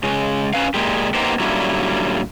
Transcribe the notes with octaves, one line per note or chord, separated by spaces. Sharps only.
C#3 G#3
C#4 B4 F5
A#2 G#3 G4
A#3 B3 D#4 G4 C5
A#2 D3 F#3 G3 C#4 E4